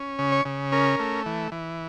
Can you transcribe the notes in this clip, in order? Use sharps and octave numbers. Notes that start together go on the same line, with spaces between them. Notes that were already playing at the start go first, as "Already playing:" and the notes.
Already playing: C#4
C#3
C#5
C#3
C#4 A#4
A3
E3
E3